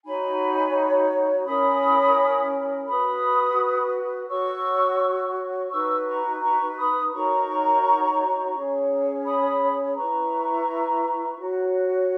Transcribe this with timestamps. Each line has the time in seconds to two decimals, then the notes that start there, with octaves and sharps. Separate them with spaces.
0.04 D#4 F#4 C#5 G#5 B5
1.46 C#4 E4 A#4 C#5 B5 D#6
2.88 F#4 B4 B5 D#6
4.29 F#4 C#5 C#6 E6
5.71 D#4 F#4 B4 C#6 E6
6.07 A#5 C#6
6.42 A#5 C#6
6.77 B5 D#6
7.12 D#4 F#4 A#4 C#5 A#5 C#6
8.55 C#4 G#4 C#5
9.25 B5 D#6
9.96 E4 B4 A#5 C#6
11.38 F#4 C#5